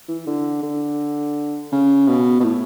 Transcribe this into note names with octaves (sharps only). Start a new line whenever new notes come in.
E3
D3
D3
C#3
B2
B2
A2